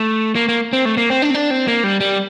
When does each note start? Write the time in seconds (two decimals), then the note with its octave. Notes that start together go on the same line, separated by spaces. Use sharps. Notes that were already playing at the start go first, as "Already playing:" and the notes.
Already playing: A3
0.35 A#3
0.48 A#3
0.73 C4
0.85 A3
0.97 A#3
1.10 C4
1.22 D4
1.30 C4
1.35 D4
1.51 C4
1.68 A#3
1.84 G3
2.00 G3